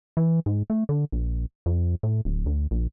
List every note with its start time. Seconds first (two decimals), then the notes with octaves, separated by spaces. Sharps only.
0.17 E3
0.46 G#2
0.70 A3
0.89 D3
1.12 A#1
1.66 F2
2.03 A2
2.25 D1
2.46 D2
2.71 A#1